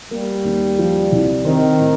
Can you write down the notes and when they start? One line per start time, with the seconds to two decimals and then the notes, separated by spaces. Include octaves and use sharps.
0.11 G3 A#3
0.45 D#2
0.79 F3
1.12 C2
1.45 D#3 C4
1.79 A2